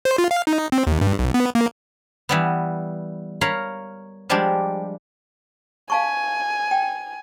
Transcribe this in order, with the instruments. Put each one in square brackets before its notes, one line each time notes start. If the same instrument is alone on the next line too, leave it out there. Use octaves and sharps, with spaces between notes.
[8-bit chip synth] C5
F4
F5
D#4
C4
D#2
G2
B1
B3
A#3
[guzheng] E3 G3 B3
A#4 C#5 F5 A#5 B5
F3 G3 G#3 D4 G4
[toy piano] F5 A5 C#6 [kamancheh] G#5
[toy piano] G5